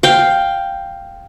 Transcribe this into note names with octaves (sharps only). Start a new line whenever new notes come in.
F5 G5